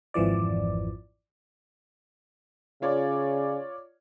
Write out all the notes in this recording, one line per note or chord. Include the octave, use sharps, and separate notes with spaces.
G#1 F2 E3 F3 D5
C#3 F4 C#5 D5